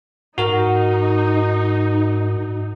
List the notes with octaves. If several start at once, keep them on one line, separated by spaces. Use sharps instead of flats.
G#2 D#4 F#4 A#4